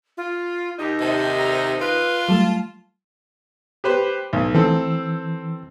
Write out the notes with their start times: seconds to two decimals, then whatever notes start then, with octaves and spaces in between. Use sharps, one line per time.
0.17 F4
0.79 D#2 D#4 G4
1.01 C3 A5
1.37 A#5
1.81 F4 B4
2.29 F#3 G3 A3 A5
3.84 G4 B4 C5
4.33 B1
4.55 E3 C4 A4